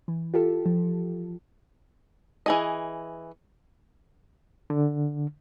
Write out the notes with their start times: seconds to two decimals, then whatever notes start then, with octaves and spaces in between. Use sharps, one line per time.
0.08 E3
0.34 F4 G4 A4
0.66 F3
2.46 E3 G#4 D#5
4.70 D3